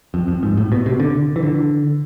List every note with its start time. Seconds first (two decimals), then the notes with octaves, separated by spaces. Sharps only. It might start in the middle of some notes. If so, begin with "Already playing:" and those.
0.14 F2
0.28 F2
0.43 G#2
0.57 A2
0.72 B2
0.86 C3
1.00 D3
1.36 E3
1.43 D3